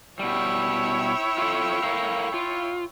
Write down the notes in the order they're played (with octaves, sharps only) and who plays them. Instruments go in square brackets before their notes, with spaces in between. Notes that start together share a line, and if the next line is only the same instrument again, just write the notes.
[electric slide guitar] B2 G3 [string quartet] E4 C#5 G5
[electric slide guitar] F4 A4
A4 A#4 F5
F4